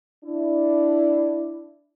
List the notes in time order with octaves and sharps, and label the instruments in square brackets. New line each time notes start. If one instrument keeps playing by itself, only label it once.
[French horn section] D4 E4